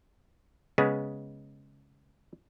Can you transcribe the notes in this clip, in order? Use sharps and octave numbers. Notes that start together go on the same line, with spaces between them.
C#3 G#3 B3